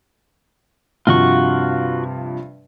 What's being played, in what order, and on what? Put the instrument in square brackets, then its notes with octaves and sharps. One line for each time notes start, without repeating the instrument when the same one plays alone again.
[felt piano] G2 C3 F3 [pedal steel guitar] F4 F#4 C#6